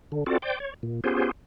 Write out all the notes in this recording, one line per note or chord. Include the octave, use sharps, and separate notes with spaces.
D3
C4 F4 F#4 A4 D5
C5 D5 G5
C#5
A#2
B3 C#4 F4 G4 G#4 C5